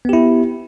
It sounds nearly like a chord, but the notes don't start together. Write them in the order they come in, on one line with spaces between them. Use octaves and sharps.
B3 G4 E4